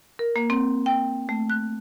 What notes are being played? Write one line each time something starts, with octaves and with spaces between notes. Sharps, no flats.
A#4
A#3
C4
G5
A3
F#6